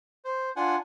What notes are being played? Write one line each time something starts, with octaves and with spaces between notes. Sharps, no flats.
C5
D4 F4 F#5 G#5